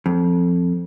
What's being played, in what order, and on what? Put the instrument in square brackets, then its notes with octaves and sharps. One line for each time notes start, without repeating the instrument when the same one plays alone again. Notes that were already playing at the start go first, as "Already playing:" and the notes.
[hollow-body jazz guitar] F2